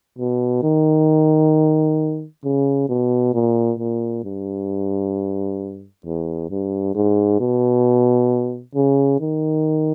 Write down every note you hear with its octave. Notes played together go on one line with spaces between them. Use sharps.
B2
D#3
C#3
B2
A#2
A#2
G2
E2
G2
G#2
B2
C#3
D#3